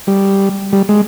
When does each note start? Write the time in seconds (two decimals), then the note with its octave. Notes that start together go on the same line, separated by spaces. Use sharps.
0.07 G3
0.73 G3
0.89 G#3